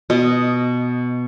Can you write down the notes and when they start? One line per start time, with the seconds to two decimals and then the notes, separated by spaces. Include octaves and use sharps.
0.10 B2 D#5